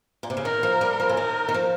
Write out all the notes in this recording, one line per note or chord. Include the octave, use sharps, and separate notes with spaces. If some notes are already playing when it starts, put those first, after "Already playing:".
A#2
C3
C#3
D#3 A#4
F3
G3
F3
C#3
D#3 A#4
D#3
F3